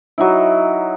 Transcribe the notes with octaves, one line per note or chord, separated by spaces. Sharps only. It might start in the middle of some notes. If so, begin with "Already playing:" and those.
F#3 D#4 E4